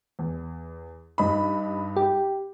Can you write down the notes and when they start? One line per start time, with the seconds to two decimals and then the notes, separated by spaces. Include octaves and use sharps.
0.19 E2
1.18 G2 D#4 B5
1.96 G4